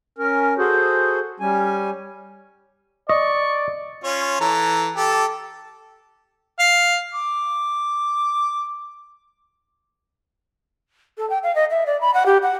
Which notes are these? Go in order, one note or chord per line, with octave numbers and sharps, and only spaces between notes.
C#4 A#4
F#4 G#4 A4 C5
G3 C#4 G#5
D5 D#5 C#6
C#4 F4 C#5
E3 A4 A#5
G4 A4 A5
F5
D6
A4
G5
F5
D#5
E5
D5
B5
F#5
G4
F#5